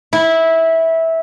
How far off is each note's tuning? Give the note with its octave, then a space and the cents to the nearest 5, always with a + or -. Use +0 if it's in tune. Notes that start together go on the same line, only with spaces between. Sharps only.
E4 -15